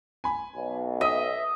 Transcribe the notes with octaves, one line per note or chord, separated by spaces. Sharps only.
G#5 B5
B1
D#5 E5 D#6